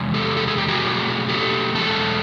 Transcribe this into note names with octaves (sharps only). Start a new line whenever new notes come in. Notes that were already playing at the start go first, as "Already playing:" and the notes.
Already playing: E2 C3 G#3
G4 A4
A4
G#4
G4
F#4 G#4
B2 F#3 A3
G4 A4
E2 B2 G#3 A4